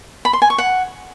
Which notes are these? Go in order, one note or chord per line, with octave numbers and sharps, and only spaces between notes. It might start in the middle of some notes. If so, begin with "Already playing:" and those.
B5
C6
G#5
C#6
F#5